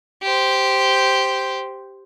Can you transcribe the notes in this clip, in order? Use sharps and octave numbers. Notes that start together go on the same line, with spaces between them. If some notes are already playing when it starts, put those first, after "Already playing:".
G4 C5